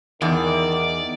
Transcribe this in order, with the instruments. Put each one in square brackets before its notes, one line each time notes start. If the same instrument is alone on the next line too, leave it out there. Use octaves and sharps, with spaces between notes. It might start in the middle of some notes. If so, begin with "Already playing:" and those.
[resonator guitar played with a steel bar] E2 [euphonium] D#3 [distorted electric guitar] D5